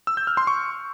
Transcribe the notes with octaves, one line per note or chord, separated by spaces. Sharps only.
E6
G6
F6
C6
C#6